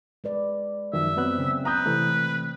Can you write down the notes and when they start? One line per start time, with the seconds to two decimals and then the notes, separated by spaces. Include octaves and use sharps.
0.24 G#3 B4 D5
0.94 F#2 D#3 F3 E5
1.17 F#3 B3 C4 F#6
1.38 C#3
1.65 B4 A#5 D#6 G6
1.86 C3 E3 A3